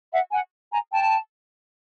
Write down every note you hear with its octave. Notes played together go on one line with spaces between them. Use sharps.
E5 F#5
F#5 G#5
G#5 A#5
G5 A5